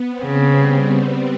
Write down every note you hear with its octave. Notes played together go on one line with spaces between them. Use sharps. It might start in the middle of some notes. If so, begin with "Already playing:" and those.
Already playing: B3
C4
C#3
G3